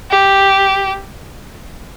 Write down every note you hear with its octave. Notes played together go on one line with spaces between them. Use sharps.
G4